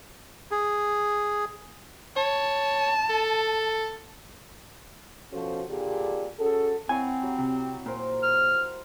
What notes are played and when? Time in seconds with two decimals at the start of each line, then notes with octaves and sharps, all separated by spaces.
0.51 G#4
2.16 C#5 A5
3.09 A4
5.32 B2 F3 C#4 F#4 A4 C5
5.69 A#2 D3 D4 G4 G#4
6.40 C#4 F#4 G#4 A4
6.89 C4 E4 C#5 F#5 G#5
7.23 F#3 G4 A#5
7.39 C3
7.86 A#2 A#4 C5
8.23 F6